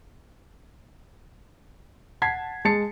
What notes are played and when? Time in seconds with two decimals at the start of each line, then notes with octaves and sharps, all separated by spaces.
2.22 F#5 A5 G#6 B6 C7
2.65 G#3 A5 A6 C7 C#7